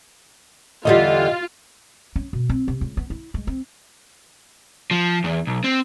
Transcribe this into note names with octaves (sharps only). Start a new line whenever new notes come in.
E2 D3 G3 F4 D#5
C#4
B2
C4
C3
C#2
B3
E4
G#3
C4
F3
E2
B1
C4